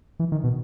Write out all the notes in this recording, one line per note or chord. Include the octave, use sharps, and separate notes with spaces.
E3
D#3
B2